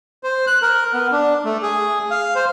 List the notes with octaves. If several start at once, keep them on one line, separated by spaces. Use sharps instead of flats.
C5
F#6
A#4
B3
D4
A3
G#4
F5
C5